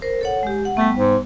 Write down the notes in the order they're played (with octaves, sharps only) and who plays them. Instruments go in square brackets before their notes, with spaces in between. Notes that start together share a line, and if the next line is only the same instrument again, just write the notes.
[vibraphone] A#4 C5
A4 C#5 F#5
G#3 G4
F#5
[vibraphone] G3 B3 [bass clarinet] A3
[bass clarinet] G#2